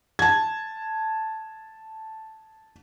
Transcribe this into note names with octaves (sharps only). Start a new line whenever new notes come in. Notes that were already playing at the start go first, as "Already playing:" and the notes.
A5 G#6